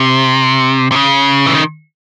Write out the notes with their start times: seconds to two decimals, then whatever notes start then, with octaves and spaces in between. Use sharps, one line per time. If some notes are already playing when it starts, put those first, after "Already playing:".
Already playing: C3
0.92 C3
0.96 C#3
1.46 E3
1.54 D#3